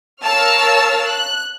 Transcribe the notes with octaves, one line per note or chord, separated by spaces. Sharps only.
A#4 C#5 F5 A5 E6 F6
F#6